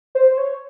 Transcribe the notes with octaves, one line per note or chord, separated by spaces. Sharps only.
C5
C#5